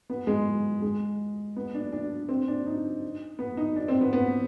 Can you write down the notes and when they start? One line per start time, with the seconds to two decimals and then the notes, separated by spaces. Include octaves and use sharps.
0.10 B3
0.27 G#3
0.82 G#3
1.56 B3
1.74 D4
1.92 D4
2.29 C4
2.48 D4
2.67 D#4
3.39 B3
3.57 D#4
3.76 D4
3.88 C4
4.01 B3
4.13 B3